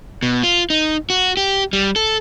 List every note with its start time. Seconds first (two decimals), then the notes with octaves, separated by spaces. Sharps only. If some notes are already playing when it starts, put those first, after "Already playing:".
0.23 B2
0.43 F4
0.70 D#4
1.10 F#4
1.37 G4
1.73 G3
1.96 A4